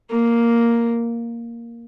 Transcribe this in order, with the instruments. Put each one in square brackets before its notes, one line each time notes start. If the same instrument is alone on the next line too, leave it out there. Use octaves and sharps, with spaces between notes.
[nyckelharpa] A#3